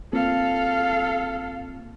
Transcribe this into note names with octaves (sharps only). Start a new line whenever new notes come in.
A#3 C4 F4 A4 F5